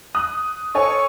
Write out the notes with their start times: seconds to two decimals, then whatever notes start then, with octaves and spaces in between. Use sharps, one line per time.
0.15 D#6 F#6
0.75 A4 C#5 G#5 C#6